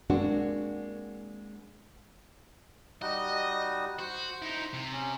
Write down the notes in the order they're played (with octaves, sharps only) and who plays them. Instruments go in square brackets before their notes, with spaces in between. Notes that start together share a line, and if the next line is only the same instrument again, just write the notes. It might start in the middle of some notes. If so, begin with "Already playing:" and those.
[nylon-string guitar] G#3 A#3 C4 D4 F#4
[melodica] G3 D#4 F#4 [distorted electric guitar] D#5
[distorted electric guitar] F#4 [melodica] C5
[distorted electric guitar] D#4 E4
C3
[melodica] C#4